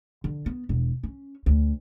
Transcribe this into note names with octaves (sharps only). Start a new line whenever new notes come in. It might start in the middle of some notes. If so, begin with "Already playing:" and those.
D3
B3
E1
C#4
D2